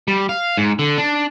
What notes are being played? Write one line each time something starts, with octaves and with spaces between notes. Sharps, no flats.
G3
F5
G#2
D3
D4